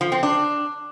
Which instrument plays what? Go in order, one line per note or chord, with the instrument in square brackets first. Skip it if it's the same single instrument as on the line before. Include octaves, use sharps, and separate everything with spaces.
[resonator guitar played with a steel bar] F3
C4
D4